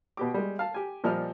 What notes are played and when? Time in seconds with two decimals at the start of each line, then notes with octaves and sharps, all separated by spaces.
0.17 B2 G4 D6
0.34 G3 G#3
0.59 F5 A5
0.74 G4 G#5
1.04 A#2 F3 G3 D#5 F6